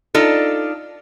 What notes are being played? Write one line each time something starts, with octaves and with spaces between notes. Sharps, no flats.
D4 D#4 F4 A4